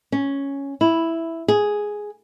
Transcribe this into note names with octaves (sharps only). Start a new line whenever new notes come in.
C#4
E4
G#4